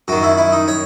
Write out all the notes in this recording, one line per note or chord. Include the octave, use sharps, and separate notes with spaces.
F#2 D#3 F#4
E4
E4
D#4
C#5